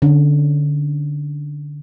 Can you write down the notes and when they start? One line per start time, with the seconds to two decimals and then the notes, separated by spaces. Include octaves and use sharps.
0.02 D3 C#4